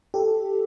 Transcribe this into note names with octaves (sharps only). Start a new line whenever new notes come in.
G4 A4